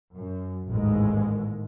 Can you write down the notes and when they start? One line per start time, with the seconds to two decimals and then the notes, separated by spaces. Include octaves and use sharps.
0.15 F#2
0.68 A1 D#2 G#2 G#3